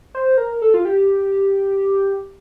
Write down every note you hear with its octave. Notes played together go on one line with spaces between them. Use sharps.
C5
A#4
A4
F4
G4